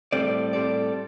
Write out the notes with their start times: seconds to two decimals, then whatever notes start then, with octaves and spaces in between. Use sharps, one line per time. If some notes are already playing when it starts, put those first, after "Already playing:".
0.13 A2 G3 C4 A4 D5
0.53 A2 G3 C4 A4 D5